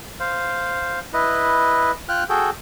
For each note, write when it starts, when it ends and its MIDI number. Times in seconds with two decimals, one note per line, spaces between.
0.20 0.99 72
0.20 0.99 77
1.13 1.91 64
1.13 1.91 71
1.13 1.91 75
2.09 2.24 65
2.09 2.24 79
2.09 2.24 89
2.09 2.24 90
2.29 2.50 66
2.29 2.50 68
2.29 2.50 69
2.29 2.50 79